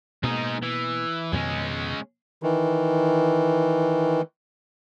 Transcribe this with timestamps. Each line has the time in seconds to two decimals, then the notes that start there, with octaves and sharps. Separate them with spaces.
0.23 B2 G#3 A#3 D#4
0.62 E3
1.32 F2 B2 D#3 G#3 C#4
2.43 D#3 E3